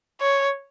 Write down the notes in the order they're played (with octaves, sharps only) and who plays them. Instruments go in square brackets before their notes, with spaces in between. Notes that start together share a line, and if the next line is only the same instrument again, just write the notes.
[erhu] C#5